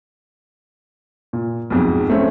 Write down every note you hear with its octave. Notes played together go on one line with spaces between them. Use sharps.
A#2
B1 F2 G#2
A3 C4 C#4